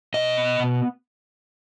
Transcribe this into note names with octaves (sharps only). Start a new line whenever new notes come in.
B2 D#5
B3
B2